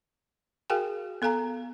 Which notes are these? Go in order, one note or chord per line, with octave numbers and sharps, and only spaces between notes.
F#4 G#4 A#4 F5 G5 G#5
B3 A4 F5 G#5 A#5